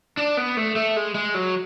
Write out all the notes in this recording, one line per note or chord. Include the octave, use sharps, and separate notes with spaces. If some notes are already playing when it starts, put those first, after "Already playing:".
D4
B3
A3
A3
G#3
G#3
F#3